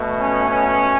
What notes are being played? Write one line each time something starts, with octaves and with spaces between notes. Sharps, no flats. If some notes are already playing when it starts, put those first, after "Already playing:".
Already playing: B2 A3
C#4
C#4